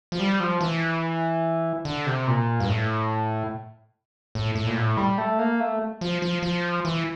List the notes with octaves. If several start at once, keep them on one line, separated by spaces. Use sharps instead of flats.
F3
G3
F3
E3
D3
C3
A#2
G2
A2
A2
A2
A#2
A2
G3
A3
A#3
A3
F3
F3
F3
E3